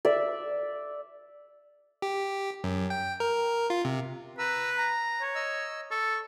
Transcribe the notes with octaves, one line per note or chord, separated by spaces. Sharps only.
D5 E5
G4
F#2
G5
A#4
F4
C3
B4 A#5 E6
A#5
C#5
D#5 E6
A4 C#6